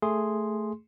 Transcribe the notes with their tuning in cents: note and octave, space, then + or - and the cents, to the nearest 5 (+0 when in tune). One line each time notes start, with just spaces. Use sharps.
A3 +0 G#4 +0 C6 +0